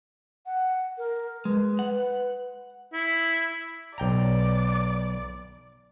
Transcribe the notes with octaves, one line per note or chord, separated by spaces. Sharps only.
F#5
A#4
G#3 B4
F#5
E4
B1 D5 G5 A#5